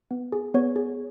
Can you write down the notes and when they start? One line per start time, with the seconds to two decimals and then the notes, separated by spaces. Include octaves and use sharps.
0.11 B3
0.32 G#4
0.54 B3 C#5
0.76 G#4